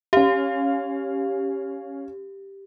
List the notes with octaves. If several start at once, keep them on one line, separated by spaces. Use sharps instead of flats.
C#4 G4 F5